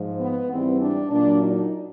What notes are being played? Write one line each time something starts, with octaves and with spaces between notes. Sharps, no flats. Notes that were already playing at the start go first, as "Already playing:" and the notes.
Already playing: G#2 F3
B3
G#2 E3 G3 C4
D4
A#2 F#3 D4
D#4